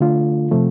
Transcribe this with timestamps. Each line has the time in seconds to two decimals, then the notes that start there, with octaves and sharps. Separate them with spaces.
0.01 D3 A3 F4
0.51 C3 F3 A3